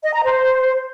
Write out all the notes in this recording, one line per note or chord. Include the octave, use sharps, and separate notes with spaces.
D#5
A#5
C5